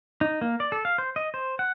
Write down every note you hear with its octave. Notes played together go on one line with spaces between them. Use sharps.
D#4
A#3
D5
A4
F5
C5
D#5
C5
F#5